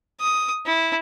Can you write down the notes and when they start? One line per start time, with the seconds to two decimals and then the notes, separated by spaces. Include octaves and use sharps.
0.21 D#6
0.66 E4